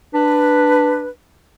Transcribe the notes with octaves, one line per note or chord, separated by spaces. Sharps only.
D4 B4